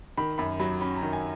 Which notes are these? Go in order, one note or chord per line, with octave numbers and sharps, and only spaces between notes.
D#3 B5
F#2 B5
F#3 B5
C#4 B5
A#5
D#3
G#5